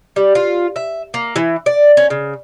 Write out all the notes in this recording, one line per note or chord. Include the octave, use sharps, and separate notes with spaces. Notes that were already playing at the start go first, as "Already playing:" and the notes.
G3
F4
E5
A#3
E3
D5
C#4
C#3